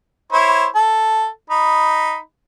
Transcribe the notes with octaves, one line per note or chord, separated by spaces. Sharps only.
E4 C5 C#5
A4
D#4 B5